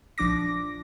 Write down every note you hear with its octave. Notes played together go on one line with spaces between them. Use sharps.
A#1 F3 D4 D6 A#6